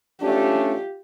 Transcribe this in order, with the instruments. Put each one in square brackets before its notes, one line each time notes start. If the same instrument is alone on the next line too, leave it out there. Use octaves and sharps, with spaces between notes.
[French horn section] A3 C#4 D4 [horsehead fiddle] F4 G4